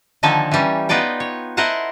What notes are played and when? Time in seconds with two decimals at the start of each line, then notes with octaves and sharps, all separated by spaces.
0.23 D3 D#3 F3 A#3 A4 G#5
0.52 E3 G3 C#4
0.89 B3 D#4 F4 D5 G5
1.20 C#5
1.57 E4 A#4 C5 D#5 F#5 A5